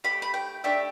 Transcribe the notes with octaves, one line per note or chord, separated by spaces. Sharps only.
A3 G4 B5
B5
G5
A3 D4 G4 E5